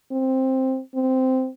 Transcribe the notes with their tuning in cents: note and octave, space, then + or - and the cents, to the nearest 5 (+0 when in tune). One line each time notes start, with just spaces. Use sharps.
C4 +5
C4 -10